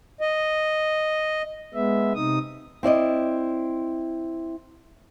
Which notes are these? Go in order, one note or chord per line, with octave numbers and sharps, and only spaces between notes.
D#5
G#3 B3 E5
C3 D#4 D#6
C4 E4 D5 D#5